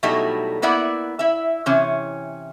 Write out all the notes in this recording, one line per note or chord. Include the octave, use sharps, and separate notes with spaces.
B2 F#3 G3 A3 D#4 E4
A#3 B3 E4 D5 F#5
E4 E5
C3 E3 C#4